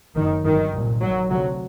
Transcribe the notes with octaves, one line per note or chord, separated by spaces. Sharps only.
F#1 F#2 D#3
G1 F#2 D#3
C2 A#2
A#1 A#2 F#3
D2 C3 F#3